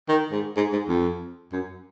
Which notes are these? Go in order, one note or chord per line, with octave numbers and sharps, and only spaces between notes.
D#3
G#2
G#2
G#2
F2
F#2